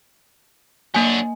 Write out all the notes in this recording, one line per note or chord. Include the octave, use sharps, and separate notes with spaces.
F#3 A#3 D4 G#5